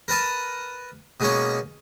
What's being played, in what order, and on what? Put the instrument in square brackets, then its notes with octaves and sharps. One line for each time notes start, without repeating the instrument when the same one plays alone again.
[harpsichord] A#4 B4 A5 D#6
B2 G#3 A#3 C#4 C#6